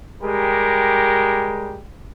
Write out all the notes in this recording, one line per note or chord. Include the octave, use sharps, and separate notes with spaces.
G3 G#3 G4 A#4